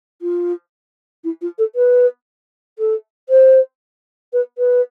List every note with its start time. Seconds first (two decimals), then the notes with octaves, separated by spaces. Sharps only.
0.21 F4
1.24 E4
1.41 F4
1.58 A4
1.75 B4
2.78 A4
3.29 C5
4.33 B4
4.58 B4